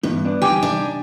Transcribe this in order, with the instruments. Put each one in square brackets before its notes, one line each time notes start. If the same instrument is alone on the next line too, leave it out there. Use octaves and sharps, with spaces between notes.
[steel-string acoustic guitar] G2 [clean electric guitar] E3 B3 D#4
[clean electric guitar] B3 D4 D5
[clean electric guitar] C3 D#4 [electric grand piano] G4 G#5 D6 [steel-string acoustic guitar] G5
[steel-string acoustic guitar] D4